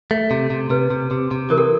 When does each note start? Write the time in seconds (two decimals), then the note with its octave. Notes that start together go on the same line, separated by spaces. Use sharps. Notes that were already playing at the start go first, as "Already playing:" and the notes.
0.11 A3
0.31 C3
0.50 C3
0.70 C3 B4
0.90 C3
1.11 C3
1.31 C3
1.50 E3 A#4
1.58 A4